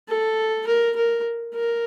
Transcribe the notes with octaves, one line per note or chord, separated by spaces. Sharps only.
A4
A#4
A#4
A#4